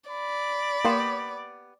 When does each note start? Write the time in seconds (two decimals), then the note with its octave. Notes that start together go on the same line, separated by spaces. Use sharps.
0.10 D5 B5
0.85 A#3 B3 G4 C6 E7